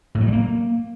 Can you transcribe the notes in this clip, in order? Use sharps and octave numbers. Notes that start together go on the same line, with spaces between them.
A2
F#3
G3
A#3